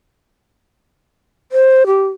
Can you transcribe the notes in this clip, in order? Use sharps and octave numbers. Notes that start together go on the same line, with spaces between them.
C5
G4